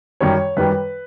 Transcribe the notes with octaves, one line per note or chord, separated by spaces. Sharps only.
F#2 D#3 G3 C#5
F#2 D#3 G3 B4